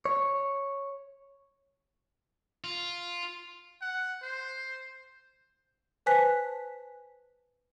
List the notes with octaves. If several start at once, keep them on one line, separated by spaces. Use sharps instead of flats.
C#5
F4
F#5
C5
B4 C5 G#5 A5 F#6 B6